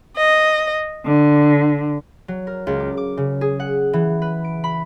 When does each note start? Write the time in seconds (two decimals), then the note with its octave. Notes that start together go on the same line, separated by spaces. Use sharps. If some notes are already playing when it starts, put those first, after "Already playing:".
0.17 D#5
1.04 D3
2.28 F#3
2.47 A#4
2.67 C#2
2.80 D6
2.97 D6
3.17 C#3
3.41 G#4
3.60 F#5
3.93 E3
4.22 B4
4.44 D7
4.64 B5